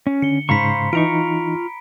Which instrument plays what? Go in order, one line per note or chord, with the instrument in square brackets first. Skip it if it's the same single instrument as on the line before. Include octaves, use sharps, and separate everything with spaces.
[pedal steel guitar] C#4
[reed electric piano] D3 [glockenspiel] C#7 G7
[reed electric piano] G#2 C#3 [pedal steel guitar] C5 F5 C#6 [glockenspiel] A#5 B5 B6
[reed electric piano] E3 D#4 [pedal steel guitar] F4 A#5 C#6 [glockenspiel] D7